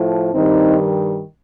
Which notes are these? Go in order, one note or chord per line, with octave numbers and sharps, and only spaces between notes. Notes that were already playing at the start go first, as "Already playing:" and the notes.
Already playing: A2 F3
G2 D#3 G3 C4 D#4